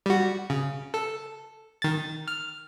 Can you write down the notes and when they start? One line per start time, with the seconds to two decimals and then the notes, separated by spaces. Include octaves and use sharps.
0.06 G3 F#4
0.50 C#3
0.94 A4
1.82 D#3 A6
2.28 F6